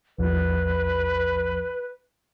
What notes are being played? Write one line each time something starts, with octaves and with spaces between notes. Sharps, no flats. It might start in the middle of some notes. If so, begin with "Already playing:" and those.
A#1 E2 F3 B4